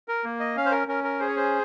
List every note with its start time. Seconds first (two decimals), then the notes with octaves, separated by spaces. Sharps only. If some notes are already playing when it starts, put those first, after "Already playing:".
0.08 A#4
0.24 A#3
0.40 D#5
0.56 C#4 F5
0.66 C5
0.72 A#4
0.87 C#4 A#4
1.04 A#4
1.20 G#4 C5
1.27 C#5
1.37 C5